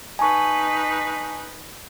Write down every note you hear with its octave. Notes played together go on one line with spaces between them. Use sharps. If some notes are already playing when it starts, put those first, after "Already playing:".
D#4 B4 G#5 A5 C#6